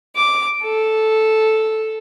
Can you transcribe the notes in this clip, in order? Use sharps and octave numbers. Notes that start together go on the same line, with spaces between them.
D6
A4